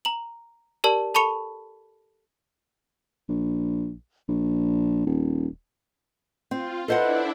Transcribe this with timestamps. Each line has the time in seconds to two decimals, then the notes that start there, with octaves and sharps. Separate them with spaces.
0.05 A#5 F#7
0.84 G4 A#4 D5 A5 F#7
1.14 A4 A5 B5 C#6 C#7 F7
3.29 A#1
4.28 A#1
5.06 D#1
6.51 C4 F4
6.88 D4 E4 A4 B4 C5 D#5 F#5